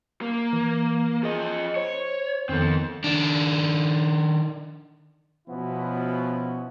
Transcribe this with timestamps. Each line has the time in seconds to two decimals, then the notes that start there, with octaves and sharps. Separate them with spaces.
0.22 A#3
0.53 E3
1.23 F3 G#4 D#5
1.76 C5 C#5
2.49 F2 D#3 B3 C4 A4
3.04 D#3 D4
5.48 B2 F3 B3 C#4 E4 F#4